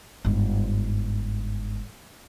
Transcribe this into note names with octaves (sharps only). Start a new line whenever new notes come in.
G1 G#2